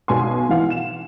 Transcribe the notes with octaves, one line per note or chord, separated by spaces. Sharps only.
B1 B2 G#5 C6
E3 F5 F#5
E7